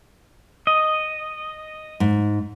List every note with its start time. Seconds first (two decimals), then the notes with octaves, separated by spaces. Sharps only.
0.67 D#5
2.00 G#2